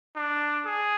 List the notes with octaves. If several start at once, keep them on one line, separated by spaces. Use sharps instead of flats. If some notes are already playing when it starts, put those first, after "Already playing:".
D4
G#4